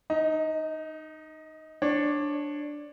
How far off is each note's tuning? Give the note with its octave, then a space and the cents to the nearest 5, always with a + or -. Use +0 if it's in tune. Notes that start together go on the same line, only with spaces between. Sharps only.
D#4 -15 D#5 +20
D4 +0 C#5 -20